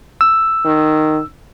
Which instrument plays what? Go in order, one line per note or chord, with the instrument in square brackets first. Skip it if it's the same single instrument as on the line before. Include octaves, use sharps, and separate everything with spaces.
[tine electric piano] E6
[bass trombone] D#3